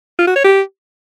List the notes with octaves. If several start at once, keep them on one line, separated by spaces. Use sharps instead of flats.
F4
F#4
C#5
G4